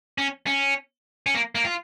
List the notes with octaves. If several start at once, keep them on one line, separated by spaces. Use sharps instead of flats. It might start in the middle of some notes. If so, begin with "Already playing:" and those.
C#4
C#4
C#4
A#3
A#3
F4